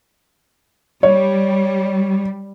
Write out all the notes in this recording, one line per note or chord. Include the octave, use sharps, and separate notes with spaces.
G3 C#5